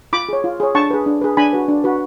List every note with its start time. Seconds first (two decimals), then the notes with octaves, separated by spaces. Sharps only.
0.13 F4 B5 D6
0.29 G#4 C#5
0.44 F4
0.60 G#4 C#5
0.75 D4 A5 C#6
0.91 G#4 B4
1.06 D4
1.21 G#4 B4
1.37 D4 G#5 B5
1.53 F#4 B4
1.68 D4
1.84 F#4 B4